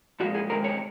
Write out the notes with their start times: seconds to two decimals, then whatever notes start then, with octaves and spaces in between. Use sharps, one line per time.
0.20 A#2 F3 G#3 F#4
0.35 G#4
0.49 C3 D#3 G#3 A#4
0.64 C#5